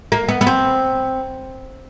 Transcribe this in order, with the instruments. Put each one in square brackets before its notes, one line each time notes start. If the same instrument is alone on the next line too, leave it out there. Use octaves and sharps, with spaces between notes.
[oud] A#3
B3
B3
C4